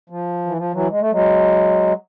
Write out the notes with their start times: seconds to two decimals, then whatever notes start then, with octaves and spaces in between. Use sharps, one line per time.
0.10 F3
0.46 E3
0.58 F3
0.73 E3 F#3
0.90 G#3
1.00 A3
1.11 F#3 G#3